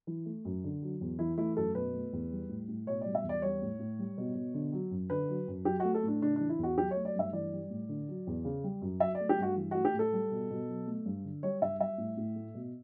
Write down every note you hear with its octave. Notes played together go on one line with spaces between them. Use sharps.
E3
A3
F#2
D3
F#3
E2
E3 E4
A3 E4
F#2 A4
B2 B4
A3
E2
G3
A2
A2
B2 C#5
G3 D5
E5
E2
D5
G3 C#5
A2
A2
G3
B2
B2
D3
F#3
F#2
D3 B4
F#3
F#2
F#3 G4
A3 F#4
A4
A2 D4
C#3 D4
E3 D4
E4
E2 F#4
F#3 G4
C#5
A3
D5
G2 E5
E3 D5
G3
A2
D3
F#3
E2
C#3
G3
F#2
F#3 E5
D5
A3
G4
G2 F#4
E3
A3 F#4
G4
A2
A4
G3
B2
B2
F#3
A3
G2
D3
G3 C#5
G2 E5
G3 E5
A2
A2
A3
B2